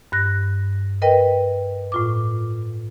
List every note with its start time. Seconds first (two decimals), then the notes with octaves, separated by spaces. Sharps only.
0.12 G2 F#6 A#6
1.02 A#4 B4 D#5 G5
1.92 A2 F4 D6